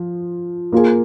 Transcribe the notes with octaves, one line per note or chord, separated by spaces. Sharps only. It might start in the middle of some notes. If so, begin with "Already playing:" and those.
Already playing: F3
A#3 F4 G#4